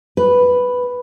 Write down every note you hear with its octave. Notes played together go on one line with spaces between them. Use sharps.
B4